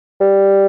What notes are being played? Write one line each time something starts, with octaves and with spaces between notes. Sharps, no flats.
G3